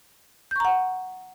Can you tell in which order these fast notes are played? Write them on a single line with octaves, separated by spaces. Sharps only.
G6 C#6 A#5 F#5